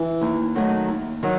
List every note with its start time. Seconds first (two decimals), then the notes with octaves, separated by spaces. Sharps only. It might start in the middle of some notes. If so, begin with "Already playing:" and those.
Already playing: E3
0.21 D#2
0.55 D#3 F#3 A3 D#4
0.89 D#2
1.23 D#3 F#3